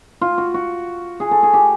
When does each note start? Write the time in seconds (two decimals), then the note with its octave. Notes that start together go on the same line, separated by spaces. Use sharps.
0.21 F4
0.38 F#4
0.54 F#4
1.20 G#4
1.31 A4
1.43 G#4
1.53 G4